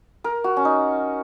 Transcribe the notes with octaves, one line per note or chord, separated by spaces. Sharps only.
A#4
F#4
C#4
D#4